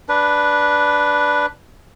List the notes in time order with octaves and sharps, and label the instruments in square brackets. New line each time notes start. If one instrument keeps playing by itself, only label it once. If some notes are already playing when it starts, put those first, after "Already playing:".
[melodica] D4 B4